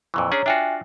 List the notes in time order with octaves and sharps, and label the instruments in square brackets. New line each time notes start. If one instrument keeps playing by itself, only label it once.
[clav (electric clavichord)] F2 A#2 E3 [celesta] C#6
[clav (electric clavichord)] C#4 D4 G#4 [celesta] C#5 A#5
[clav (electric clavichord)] D4 F4 F#4 [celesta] E5 G5 G#5